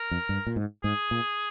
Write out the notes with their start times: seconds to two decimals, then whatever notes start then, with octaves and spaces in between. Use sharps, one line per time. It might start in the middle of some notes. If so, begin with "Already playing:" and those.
Already playing: A#4
0.11 F2
0.29 G2
0.47 A#2
0.56 G#2
0.84 G#2 G#4
1.11 A#2